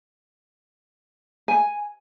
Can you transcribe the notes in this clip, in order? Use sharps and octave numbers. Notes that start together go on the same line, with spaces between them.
G#5